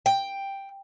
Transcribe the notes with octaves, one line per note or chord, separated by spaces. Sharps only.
G5